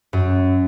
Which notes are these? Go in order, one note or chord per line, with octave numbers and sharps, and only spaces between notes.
F#2